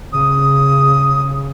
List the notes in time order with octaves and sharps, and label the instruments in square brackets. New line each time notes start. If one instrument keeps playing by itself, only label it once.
[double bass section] C#3 [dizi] D#6